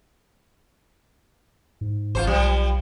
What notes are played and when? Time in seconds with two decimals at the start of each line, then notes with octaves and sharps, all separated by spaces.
1.81 G#2
2.15 A1 F4 A4 C5
2.27 B1 F3 G3